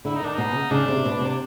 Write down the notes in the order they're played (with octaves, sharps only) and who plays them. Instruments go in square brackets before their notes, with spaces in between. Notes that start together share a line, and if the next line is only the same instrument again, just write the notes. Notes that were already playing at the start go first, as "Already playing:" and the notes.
[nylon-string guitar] D3 [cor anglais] E4
[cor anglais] D#4
[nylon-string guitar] D#3 [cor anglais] D4
[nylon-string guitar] B2 [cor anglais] D#4
[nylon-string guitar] C#3
[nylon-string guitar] C#3 [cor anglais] D4
[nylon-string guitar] C3
B2
C3